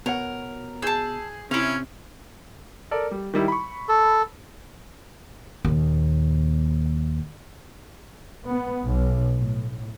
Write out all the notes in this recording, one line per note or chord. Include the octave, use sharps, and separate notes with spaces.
B2 A#4 C#5 F#5
G#4 A5 E6 G6
C3 C#4 E4 F5
A4 A#4 D5
G3
D#3 G3 E4
B5 C#6
A4
D#2 A#2
B3
B1
A2